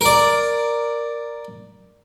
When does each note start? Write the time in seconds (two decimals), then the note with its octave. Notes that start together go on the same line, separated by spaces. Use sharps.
0.01 A#4 D5